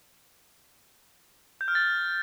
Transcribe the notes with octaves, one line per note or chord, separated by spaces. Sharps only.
G6
F6
A6